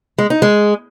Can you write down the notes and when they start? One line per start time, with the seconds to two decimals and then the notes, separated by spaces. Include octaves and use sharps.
0.18 G#3
0.30 D#4
0.42 G#3